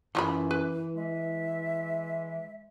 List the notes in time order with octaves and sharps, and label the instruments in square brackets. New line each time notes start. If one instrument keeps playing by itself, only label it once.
[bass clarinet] F#2 [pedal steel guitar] E3 [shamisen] F3 F4 B5
[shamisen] B4
[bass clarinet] G#3 [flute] E5